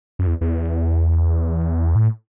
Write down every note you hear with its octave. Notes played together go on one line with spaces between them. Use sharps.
F#2
E2
E2
A2